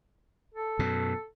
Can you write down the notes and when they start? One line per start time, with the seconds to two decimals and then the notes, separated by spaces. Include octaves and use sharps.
0.54 A4
0.79 F#2 B2